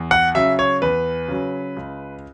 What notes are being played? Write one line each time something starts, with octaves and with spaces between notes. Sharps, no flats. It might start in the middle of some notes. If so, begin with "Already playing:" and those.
Already playing: E2
F#5
C#3 F#3 E5
C#5
E2 B4
C#3 F#3
C#2